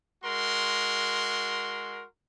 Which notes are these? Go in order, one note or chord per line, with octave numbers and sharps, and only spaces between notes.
G#3 F#4 A#4 C6